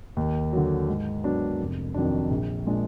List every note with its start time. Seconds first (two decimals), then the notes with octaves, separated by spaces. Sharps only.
0.17 D#2
0.53 D3 F#3
0.88 G#2
1.24 F#3 B3 D4
1.60 F1
1.94 F2 D#3 F#3 D4
2.31 A#1
2.67 A#2 G#3 D4